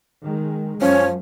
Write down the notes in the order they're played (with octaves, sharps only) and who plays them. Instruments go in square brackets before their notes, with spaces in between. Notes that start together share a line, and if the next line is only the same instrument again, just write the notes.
[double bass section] D#3 G#3
[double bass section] F#2 [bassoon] F3 [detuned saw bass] C#4 [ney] C#5